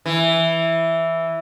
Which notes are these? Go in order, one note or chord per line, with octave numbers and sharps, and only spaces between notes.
E3